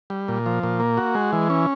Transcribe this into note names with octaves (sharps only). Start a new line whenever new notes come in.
G3
A#2
F3
A#2
A#3
F#4
G#3
E3
C#4